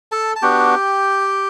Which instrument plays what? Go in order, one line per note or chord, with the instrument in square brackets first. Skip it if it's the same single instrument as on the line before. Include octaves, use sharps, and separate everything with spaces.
[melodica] A4 A5
A5
B3 D4 F#4 G4 G5